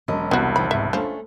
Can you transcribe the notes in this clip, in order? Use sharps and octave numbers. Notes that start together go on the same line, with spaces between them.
E1 F#3 C#4 D#5
C2 B3 F#4
D#3 F3 B5
G#2 C#3 B3 E5
F3 A3 C#4 D4